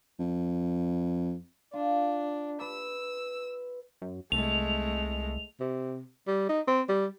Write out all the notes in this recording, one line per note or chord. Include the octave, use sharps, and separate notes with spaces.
F2
D4 F4
B4 E6
F#2
C2 G#3 A3 F7
C3
G3
D#4
C4
G3